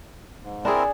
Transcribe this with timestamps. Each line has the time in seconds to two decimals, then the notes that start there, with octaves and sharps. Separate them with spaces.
0.43 G#2
0.65 C4 D4 E4 G#4 A#4